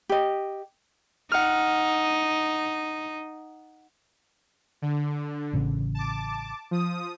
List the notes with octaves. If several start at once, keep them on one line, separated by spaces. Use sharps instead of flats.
G4 D#5
D#4 F#5 F6
D3
A1 C#3
A5 D6
F3 D#6